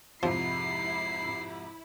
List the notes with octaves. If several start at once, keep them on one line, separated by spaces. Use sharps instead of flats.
F2 G#2 C3 F3 E4 B5 C7